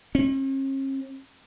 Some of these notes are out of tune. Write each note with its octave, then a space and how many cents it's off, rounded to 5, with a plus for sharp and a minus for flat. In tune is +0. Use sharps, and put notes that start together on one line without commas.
C#4 -45